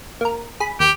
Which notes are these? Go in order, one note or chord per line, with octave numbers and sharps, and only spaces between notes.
A#3 A#4
G#4 B5
D#2 G4